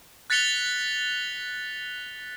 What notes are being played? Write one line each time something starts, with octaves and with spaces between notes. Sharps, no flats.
F#6 A6 B6 C#7 F7 G7